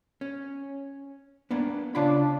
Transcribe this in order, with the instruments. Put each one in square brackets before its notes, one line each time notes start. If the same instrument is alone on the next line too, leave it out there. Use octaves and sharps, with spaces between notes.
[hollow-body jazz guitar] C#4
A#3 B3 D4
[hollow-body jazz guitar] C#3 F4 B5 [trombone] D4